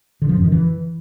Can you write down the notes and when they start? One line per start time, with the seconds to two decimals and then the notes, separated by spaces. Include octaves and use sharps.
0.22 D3
0.29 F3
0.37 F#2
0.44 D#3
0.52 E3